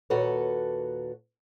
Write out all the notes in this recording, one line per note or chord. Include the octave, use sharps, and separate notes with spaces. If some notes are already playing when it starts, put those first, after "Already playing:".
D#2 A#2 F#4 A4 B4 C#5